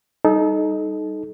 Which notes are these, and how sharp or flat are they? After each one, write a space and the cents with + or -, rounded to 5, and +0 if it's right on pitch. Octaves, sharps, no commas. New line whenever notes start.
G3 +0 D#4 +0 A4 -30